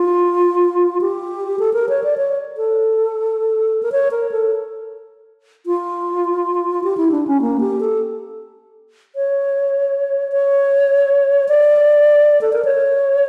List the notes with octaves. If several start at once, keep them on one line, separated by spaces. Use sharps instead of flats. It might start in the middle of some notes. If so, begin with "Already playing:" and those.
Already playing: F4
G4
A4
A#4
C#5
D5
C#5
A4
A#4
C#5
A#4
A4
F4
G4
E4
D4
C#4
A#3
G4
A4
C#5
C#5
D5
A4
A#4
C#5